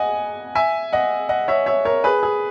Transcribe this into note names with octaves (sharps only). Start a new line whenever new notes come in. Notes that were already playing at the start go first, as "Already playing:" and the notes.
Already playing: D#5 F#5 G#5
E5 G#5
D#5 F#5
D#5 F#5
C#5 E5
C#5 E5
A#4 C#5
G#4 B4
G#4